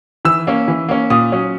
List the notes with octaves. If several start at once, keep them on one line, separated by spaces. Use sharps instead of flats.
E3 E6
A#3 C#4
E3
A#3 C#4
A#2 D#6
F#3 C#4